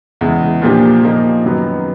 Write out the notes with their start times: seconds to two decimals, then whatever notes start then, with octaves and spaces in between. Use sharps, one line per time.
0.21 E2 C#3 E3 G#3
0.62 A#2 F3 A#3 D4 G4
1.03 F3 A#3 D#4
1.44 F#2 D#3 F#3 B3